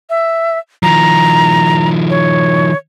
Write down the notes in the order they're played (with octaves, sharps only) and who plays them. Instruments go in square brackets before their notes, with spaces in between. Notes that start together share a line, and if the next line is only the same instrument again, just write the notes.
[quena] E5
[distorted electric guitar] D#3 F3 [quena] A#5
[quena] C#5